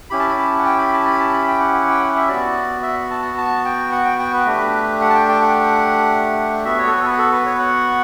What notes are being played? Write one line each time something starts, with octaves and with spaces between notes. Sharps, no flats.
C#4 E4 G4 B5
A5
B5
A5
F#5
G5
B5
A5
B5
A5
B5
G5
F#5
F#5
G5
F#5
E5
B3 F#4 D5
E5
A5
A5
G5
F#5
G5
G5
B4
A3 D4 G4
F#5
A5
G5
G5
F#5
B3 F#4 E5
C#5
A4
B4
A4
B4
A4
B4
C#5
F#5